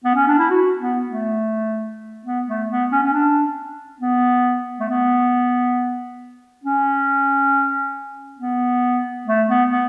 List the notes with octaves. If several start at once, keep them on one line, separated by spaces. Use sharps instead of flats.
B3
C#4
D4
E4
F#4
B3
A3
B3
A3
B3
C#4
C#4
D4
B3
A3
B3
C#4
B3
A3
B3
B3